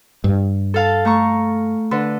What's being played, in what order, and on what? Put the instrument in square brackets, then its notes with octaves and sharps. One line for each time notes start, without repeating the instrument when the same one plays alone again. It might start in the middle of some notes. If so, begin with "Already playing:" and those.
[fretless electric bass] G2
[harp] A4 F5 A5
A3 A#5 C#6
D3 B4